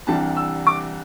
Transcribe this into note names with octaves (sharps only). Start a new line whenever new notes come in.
C2 C3 E3 G3 D4 A5
E6
D6